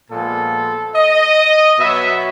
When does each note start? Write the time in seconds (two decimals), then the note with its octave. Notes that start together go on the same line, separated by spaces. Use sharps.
0.11 A#2 F3 G#3 B3 A4
0.96 D#5
1.79 B2 F#3 B3 E5